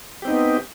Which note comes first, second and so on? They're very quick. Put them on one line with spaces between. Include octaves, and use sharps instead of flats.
G4 C4 D#4 B3